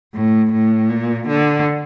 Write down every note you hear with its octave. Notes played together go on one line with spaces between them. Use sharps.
A2
A2
A#2
D3